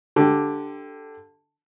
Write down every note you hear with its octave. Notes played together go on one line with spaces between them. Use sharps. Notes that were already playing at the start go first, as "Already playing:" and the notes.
D3 G4